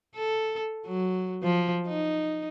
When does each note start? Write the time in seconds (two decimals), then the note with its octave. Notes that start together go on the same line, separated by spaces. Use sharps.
0.16 A4
0.87 F#3
1.43 F3
1.88 D#4